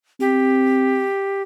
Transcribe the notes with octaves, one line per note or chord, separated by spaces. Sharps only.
C4 G4